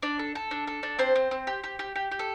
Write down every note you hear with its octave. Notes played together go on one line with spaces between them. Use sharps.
D4 D5
A4
A4
D4
A4
D4
C4 C5
C4
C4
G4
G4
G4
G4
G4
A4